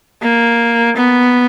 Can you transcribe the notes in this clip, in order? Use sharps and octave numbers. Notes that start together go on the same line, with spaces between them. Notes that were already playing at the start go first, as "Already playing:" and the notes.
A#3
B3